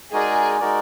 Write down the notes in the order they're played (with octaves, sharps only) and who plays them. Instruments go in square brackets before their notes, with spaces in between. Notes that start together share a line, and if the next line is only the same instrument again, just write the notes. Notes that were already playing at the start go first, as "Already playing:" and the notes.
[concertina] G#3 D#4 F#4 A#4 D5 [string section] G#4
[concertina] G#3 D#4 F#4 A#4 D5